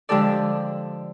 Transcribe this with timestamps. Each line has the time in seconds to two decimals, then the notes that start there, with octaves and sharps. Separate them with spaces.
0.09 D3 F3 G#3 G4 A4 D5